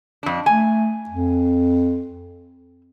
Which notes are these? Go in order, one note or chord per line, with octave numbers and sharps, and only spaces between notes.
F2 D4
A3 G#5
F2